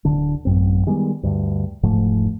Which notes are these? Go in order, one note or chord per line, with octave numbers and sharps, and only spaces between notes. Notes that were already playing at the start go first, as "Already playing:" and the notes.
D1 D3 D4
A1 F#2 C4
D#3 G3 G#3 B3
D2 G2
E1 G#2 F3 A3